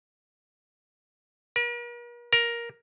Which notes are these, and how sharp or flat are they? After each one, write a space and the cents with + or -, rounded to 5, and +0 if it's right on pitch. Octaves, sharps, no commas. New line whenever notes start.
A#4 +45
A#4 +10